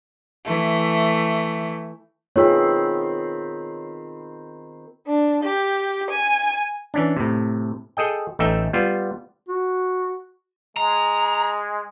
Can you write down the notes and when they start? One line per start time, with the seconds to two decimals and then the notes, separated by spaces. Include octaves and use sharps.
0.44 E3 A3
2.36 D#3 B3 C4 F4 G#4 C#5 B5
5.06 D4
5.43 G4
6.10 G#5
6.94 E3 C#4 D4
7.17 A2 C3
7.97 G#4 A4 D#5 G5
8.39 A1 A3 D#4 E5 G5
8.73 G3 B3 F4
9.49 F#4
10.77 G#3 A#5